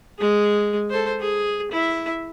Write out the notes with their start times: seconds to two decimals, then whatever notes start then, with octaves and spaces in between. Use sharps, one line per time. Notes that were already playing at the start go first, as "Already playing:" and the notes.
0.19 G#3 G#4
0.90 A4 C5
1.20 G#4
1.72 E4 E5